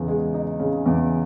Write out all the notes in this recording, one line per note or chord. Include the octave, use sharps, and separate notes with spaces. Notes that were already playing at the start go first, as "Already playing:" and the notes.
Already playing: E2 C#3
G#3
D#4
C#3
E2